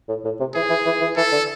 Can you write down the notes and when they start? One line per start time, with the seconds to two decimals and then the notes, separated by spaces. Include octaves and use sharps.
0.09 A2
0.24 A2
0.40 C3
0.54 E3 G#4
0.70 E3
0.86 E3
1.01 E3
1.16 E3 A4
1.32 D3